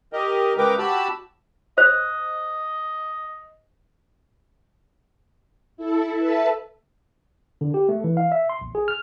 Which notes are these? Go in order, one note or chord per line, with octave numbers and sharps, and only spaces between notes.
G4 A#4 D#5
C#3 G#3 A#4 B4 G5 D6
F#4 G4 A5 B5 E6
C5 D#5
E4 A4
A4 B4 E5 A5
D3
G4
A3
E3
F5
E5
C6
A#1
G#4
F6